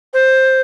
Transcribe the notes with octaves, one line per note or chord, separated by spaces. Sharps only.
C5